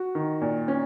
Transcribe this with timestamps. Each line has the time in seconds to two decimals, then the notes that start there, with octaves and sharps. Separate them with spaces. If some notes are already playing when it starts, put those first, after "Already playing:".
Already playing: F#4
0.15 D#3
0.41 A#2
0.68 C#4